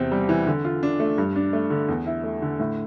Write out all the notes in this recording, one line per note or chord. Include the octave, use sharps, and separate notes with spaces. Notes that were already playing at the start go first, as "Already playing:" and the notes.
Already playing: E2 C3 C4
G3
E3
D3
F4
D4
A3
G2
D4
A3
D3
E2
E4
A3
D3
A2